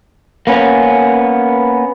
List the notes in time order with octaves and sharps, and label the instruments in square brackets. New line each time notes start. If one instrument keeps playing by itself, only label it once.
[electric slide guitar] A#3 B3 C#4